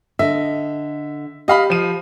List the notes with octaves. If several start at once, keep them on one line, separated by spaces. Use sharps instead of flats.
D3 D#5 E5
G4 D#5 F5 B5
F3 D#7